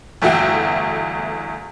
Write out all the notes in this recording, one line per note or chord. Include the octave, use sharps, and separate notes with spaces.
G1 E2 A3 F#4 E5 G5